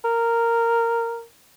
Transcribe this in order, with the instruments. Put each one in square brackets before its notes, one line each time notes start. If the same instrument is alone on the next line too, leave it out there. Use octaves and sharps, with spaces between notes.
[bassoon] A#4